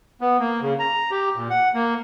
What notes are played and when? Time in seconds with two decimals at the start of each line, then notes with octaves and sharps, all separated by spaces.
0.21 B3
0.40 A#3
0.62 C#3
0.79 A#5
1.11 G4
1.36 A#2
1.50 F#5
1.74 A#3